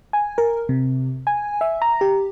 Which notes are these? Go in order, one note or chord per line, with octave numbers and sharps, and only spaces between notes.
G#5
A#4
C3
G#5
E5
A#5
G4